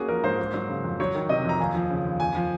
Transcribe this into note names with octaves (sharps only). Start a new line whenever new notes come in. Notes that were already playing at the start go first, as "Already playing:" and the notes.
Already playing: A#3 C#4 F#4 G#4
F3 A#4
G#2 C5
A#3
F#3
C#3
F2
F#3 C#5
D#3
C3 D#5
F2
A#5
D#2 G#5
F3
C#3
D#2
F2 G#5
F3